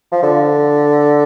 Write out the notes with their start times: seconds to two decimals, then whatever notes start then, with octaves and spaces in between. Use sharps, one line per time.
0.12 F3
0.23 D3